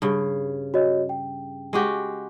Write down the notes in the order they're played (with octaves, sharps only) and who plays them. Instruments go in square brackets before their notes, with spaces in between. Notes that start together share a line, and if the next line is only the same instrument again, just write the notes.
[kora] G2 C#3
[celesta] F#4 C#5 D#5
G5
[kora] G#3 F#4 G4